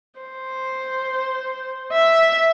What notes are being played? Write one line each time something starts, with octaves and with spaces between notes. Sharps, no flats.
C5
E5